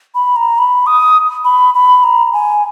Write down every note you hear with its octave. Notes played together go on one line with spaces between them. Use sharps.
B5
A#5
B5
D#6
B5
B5
A#5
G#5